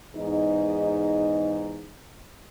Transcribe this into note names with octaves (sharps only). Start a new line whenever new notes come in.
E2 G#2 D#4